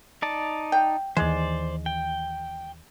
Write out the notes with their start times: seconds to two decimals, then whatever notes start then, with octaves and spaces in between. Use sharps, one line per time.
0.22 D#4 D5 A5
0.72 G5
1.17 D#2 E3 G#3 C5 D5
1.86 G5